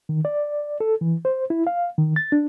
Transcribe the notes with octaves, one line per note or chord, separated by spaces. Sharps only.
D#3
D5
A4
E3
C5
E4
F5
D#3
A6
D4